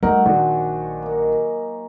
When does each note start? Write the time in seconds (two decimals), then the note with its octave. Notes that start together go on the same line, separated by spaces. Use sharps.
0.03 F#3 G3 A3 D#4 A#4 F#5
0.26 A#1 D#3 D4 F#4 C5 G#5
1.02 A#3 D#4